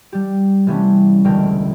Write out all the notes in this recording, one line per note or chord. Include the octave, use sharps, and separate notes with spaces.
G3 G4
C3 E3 G3 A3 B3 C#4
E1 C#2 D3 A#4 G5